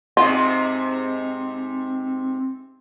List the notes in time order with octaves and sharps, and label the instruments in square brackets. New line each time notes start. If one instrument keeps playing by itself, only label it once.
[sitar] G#2 C3 [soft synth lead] C4 [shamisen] F4